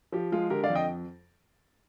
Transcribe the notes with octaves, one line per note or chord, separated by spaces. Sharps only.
F3 G4
G#3 F4 G#4
D3 G4 A#4
D5 F5
F2
D#5 G5